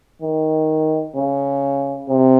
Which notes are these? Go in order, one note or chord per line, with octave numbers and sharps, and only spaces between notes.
D#3
C#3
C3